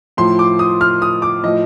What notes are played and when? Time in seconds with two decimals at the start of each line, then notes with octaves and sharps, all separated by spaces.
0.17 A2 F3 C6
0.39 D6
0.59 D#6
0.81 F6
1.02 D#6
1.22 D6
1.43 A2 F3 D#5